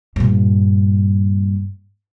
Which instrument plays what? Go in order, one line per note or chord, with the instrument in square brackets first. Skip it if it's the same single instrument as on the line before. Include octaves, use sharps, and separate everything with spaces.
[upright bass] G2 A#2